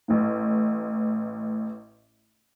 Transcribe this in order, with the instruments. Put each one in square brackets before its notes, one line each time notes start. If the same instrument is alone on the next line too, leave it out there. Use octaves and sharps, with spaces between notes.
[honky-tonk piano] A1 A2